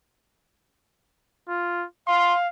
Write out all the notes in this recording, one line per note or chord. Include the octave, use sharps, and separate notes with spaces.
F4
F5 C6